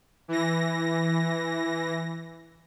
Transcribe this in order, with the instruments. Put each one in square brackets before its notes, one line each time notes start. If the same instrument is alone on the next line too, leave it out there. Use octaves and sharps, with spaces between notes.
[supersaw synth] E3 A#6